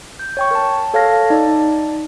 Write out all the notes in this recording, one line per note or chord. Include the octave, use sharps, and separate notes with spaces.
G6
C#5 G5 C#6
A#4 A5
A4 C#5 F5 A5 F6 A#6
D#4 D5 A5